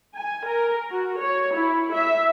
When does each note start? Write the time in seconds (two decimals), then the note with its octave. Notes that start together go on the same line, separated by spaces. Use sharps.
0.16 G#5
0.47 A#4
0.92 F#4
1.21 C#5
1.54 E4
1.92 E5